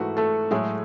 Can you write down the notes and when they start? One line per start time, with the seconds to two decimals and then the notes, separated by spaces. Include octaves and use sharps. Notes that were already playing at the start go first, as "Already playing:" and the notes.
Already playing: G#2 E3 A3 F#4
0.17 A3 A4
0.51 A2 F#3 G#3 A3 G#4